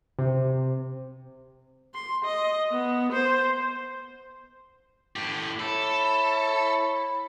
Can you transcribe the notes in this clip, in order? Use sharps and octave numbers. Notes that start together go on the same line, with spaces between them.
C3
C6
D#5
B3
C5
A2 G4
E4 A4 C#5 B5